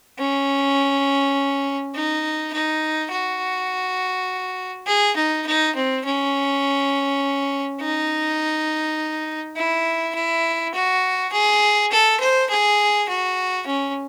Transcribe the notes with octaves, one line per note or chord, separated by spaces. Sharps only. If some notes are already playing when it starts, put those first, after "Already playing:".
C#4
D#4
D#4
F#4
G#4
D#4
D#4
C4
C#4
D#4
E4
E4
F#4
G#4
A4
C5
G#4
F#4
C#4